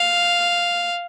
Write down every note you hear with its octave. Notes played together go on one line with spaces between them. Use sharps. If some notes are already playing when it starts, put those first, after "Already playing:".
Already playing: F5